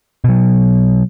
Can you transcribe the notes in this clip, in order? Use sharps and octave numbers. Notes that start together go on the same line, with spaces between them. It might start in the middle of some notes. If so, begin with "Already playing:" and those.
B2 F#3